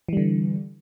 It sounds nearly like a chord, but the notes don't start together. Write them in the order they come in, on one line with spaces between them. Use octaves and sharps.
E3 G3 D3